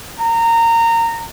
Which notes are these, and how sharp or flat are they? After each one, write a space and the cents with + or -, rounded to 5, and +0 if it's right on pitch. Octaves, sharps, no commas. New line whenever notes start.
A#5 -20